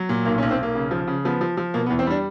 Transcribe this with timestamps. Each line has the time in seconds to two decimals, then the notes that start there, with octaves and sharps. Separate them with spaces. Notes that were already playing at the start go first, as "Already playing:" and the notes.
Already playing: F#3
0.09 A#2
0.25 B1 A#3
0.38 C#4
0.42 B1
0.51 C4
0.58 B1 A#3
0.75 C#3
0.91 F3
1.07 C#3
1.25 F3 B3
1.41 F3
1.57 F3
1.74 B2 A#3
1.86 B3
1.90 E2
1.99 C4
2.06 G3 D4